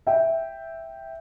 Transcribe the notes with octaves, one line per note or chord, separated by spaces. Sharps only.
E5 G5